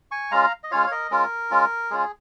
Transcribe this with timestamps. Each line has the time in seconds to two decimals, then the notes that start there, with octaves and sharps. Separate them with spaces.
0.11 G#5 C#6
0.31 G#3 C#4 F4 F5 A#5
0.64 D#5
0.71 G#3 C#4 F4 C#5 F5
0.86 C#5
0.91 A#4 D#5
1.11 G#3 C#4 F4 A#4
1.51 G#3 C#4 F4
1.91 G#3 C#4 F4 G#4